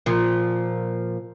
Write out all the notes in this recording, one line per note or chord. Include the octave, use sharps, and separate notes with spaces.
A#2 F3